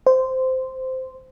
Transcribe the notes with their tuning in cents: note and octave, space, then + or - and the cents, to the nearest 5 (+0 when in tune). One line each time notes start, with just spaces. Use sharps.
C5 -10